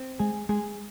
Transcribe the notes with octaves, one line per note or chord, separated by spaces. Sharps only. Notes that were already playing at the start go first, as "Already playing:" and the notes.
Already playing: C4
G#3 G#4
G#3 G#4